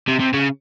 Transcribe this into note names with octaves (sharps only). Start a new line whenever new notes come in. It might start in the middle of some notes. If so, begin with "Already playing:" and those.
C3
C3
C#3